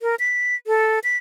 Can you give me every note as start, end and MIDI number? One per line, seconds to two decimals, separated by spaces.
0.01 0.15 70
0.20 0.55 95
0.67 0.99 69
1.04 1.17 95